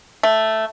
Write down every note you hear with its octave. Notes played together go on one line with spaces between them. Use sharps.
A3